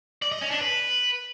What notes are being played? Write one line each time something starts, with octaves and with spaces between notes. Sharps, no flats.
D5
D#5
C#4
D4
B4